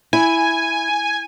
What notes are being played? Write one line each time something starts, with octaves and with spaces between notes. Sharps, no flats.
E4 G#5